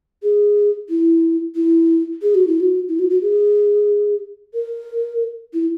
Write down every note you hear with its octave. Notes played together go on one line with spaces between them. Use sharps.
G#4
E4
E4
G#4
F#4
E4
F#4
E4
F#4
F#4
G#4
A#4
E4